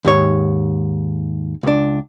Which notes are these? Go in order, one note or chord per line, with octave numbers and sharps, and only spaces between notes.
D#2 G#2 C#5
C#2 D4